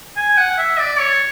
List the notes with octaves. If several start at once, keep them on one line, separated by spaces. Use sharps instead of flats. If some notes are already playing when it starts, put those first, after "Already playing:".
G#5
F#5
E5
D5
C#5